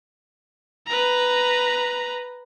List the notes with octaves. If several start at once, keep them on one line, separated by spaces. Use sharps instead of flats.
B4 A#5